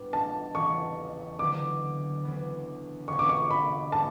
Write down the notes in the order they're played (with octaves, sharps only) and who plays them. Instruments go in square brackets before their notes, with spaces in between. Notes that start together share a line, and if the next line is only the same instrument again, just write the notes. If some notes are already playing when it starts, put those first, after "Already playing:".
Already playing: [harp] A2 G3 B3 D4
[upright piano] A5
[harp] E2 C#3 E3 [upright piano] C#6
[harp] D2 D3 F#3 B3 E4 [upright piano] D6
[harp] D2 C#3 E3 B3
[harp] E1 D2 C#3 [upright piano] C#6
[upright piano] D6
C#6
B5
[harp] A2 G3 [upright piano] A5